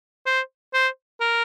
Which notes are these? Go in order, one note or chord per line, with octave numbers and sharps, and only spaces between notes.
C5
C5
A#4